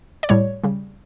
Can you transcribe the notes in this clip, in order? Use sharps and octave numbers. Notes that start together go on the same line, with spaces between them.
D5
A2 G3 C#5
C#3 G3